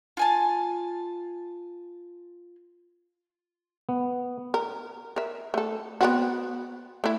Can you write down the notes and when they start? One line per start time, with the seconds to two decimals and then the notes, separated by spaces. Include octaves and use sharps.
0.17 F4 G#5 A5
3.89 B3
4.54 A#4
5.16 A#4 E5
5.54 A3 A4
6.01 B3 C4 F#4
7.04 A3 E4